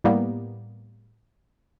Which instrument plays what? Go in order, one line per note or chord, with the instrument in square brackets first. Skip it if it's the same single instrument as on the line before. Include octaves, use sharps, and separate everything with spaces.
[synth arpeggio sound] A2 G3 A#3 B3